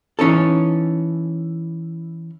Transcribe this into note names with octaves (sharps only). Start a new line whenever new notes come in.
E3 C#4 D#4 A4